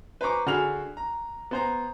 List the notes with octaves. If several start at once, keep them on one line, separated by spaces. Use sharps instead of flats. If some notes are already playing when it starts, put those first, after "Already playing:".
B4 C5 A#5 C#6 D6
D3 F#4 G#4 B5 F6 F7
A#5
B3 C5 A#5